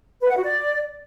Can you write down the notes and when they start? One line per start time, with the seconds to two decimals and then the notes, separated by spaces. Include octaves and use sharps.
0.21 B4
0.29 F#5
0.36 F#4
0.43 D5